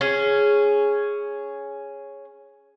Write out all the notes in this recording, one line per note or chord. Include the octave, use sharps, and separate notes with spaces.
C#4 G#4